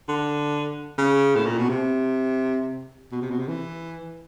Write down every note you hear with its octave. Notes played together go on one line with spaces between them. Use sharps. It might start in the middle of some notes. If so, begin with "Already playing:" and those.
D3
C#3
A2
A#2
B2
C3
B2
C3
B2
C3
E3